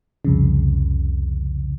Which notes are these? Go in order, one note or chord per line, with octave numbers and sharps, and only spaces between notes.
C2 F2 C#3